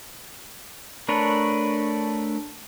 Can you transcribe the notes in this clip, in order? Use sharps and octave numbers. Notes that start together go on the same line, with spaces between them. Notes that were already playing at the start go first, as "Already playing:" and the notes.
A3 D4 A#4 B4 C#5